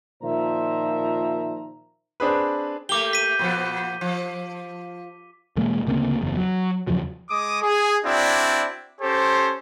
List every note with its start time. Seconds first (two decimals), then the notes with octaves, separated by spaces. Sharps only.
0.22 A#2 D#3 F3 C5 E5 A#5
2.20 C4 D4 G#4 B4
2.89 A3 A#3 G4 D6 G7
3.13 B6 D#7
3.39 A#2 F3 B3
4.01 F3
5.56 E1 E3 G#3 A#3
5.87 D2 C#3 A#3 C4
6.21 F#1 E2
6.37 F#3
6.87 E2 C#3 F3 F#3
7.30 G#3 D6 D#6
7.63 G#4
8.04 C4 D4 E4 F#4 D5
9.01 C#4 G4 A4 C5